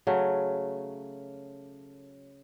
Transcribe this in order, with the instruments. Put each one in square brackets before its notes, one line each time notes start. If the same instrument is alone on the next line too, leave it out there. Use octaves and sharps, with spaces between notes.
[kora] C#3 F#3 A3